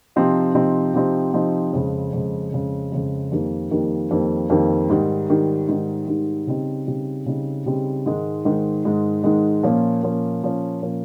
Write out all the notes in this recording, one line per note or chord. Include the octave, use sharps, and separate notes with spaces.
C3 F3 C4 D#4
C3 F3 C4 D#4
C3 F3 C4 D#4
C3 F3 C4 D#4
F2 C#3 G#3
F2 C#3 G#3
F2 C#3 G#3
F2 C#3 G#3
F2 D#3 G3 A#3
F2 D#3 G3 A#3
F2 D#3 G3 A#3
F2 D#3 G3 A#3
G#2 D#3 G3
G#2 D#3 G3
G#2 D#3 G3
G#2 D#3 G3
C#3 G3 C4 D#4
C#3 G3 C4 D#4
C#3 G3 C4 D#4
C#3 G3 C4 D#4
G#2 D#3 G#3
G#2 D#3 G#3
G#2 D#3 G#3
G#2 D#3 G#3
A#2 F3 A#3 C#4
A#2 F3 A#3 C#4
A#2 F3 A#3 C#4
A#2 F3 A#3 C#4